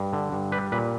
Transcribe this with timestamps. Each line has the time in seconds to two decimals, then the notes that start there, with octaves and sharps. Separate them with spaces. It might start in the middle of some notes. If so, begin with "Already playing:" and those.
Already playing: G2
0.13 D3
0.32 G2
0.52 G3 B4
0.72 A#2 B4